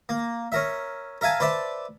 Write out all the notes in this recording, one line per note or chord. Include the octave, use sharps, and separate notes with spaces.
A#3
C#4 A#4 E5
A#4 E5 F5 G#5 A5
B4 C5 D5 E5 A5